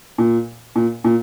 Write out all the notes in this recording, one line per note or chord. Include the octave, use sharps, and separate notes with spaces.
A#2
A#2
A#2